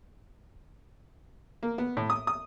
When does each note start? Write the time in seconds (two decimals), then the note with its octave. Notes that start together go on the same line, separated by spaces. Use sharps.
1.63 A#3
1.78 B3
1.97 A2
2.10 D#6
2.27 D#6